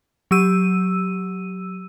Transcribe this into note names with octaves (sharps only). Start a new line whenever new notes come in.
F#3 G4 E6 D#7